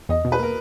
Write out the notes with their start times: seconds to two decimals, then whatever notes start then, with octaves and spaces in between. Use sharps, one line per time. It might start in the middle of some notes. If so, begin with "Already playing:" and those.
0.09 E2 D#5
0.25 B2
0.32 B4
0.39 A#3 A#4